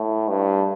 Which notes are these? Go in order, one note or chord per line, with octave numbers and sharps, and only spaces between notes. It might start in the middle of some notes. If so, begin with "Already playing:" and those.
Already playing: A2
G2